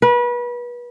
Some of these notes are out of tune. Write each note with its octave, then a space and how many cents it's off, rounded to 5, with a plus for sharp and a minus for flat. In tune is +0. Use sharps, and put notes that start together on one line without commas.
B4 -30